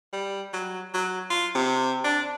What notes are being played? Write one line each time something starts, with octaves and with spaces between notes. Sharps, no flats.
G3
F#3
F#3
F4
C3
D4